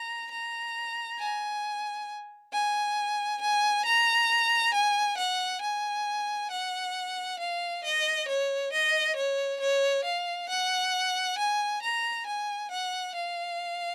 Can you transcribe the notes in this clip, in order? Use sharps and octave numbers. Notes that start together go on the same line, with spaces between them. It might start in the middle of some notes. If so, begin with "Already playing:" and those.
Already playing: A#5
A#5
G#5
G#5
G#5
A#5
G#5
F#5
G#5
F#5
F5
D#5
C#5
D#5
C#5
C#5
F5
F#5
G#5
A#5
G#5
F#5
F5